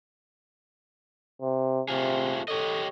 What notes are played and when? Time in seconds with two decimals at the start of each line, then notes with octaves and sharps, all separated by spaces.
1.41 C3
1.89 C3 A3 F4 G#4
2.48 G4 A4 C#5 D#5